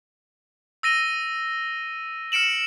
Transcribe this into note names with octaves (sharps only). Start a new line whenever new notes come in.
E6 A#6 D#7 G7
F6 C#7 D7 E7 F#7